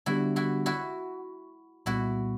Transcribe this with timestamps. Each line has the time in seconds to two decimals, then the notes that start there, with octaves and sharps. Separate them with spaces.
0.06 D3 G3 B3 D4 E4 F#4 G4
0.36 E4 F#4
0.66 E4 F#4
1.86 C2 A#2 G3 B3 E4 F#4